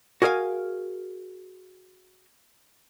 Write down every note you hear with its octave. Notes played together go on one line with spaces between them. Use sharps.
F#4 G#4 A#4 D#5 F5 G#5